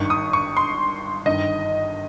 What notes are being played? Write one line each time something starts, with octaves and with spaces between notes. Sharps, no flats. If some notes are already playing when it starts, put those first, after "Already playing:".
Already playing: G#1 G2 D#3 C#6
D#6
C#6
C6
G1 G2 D#3 D#5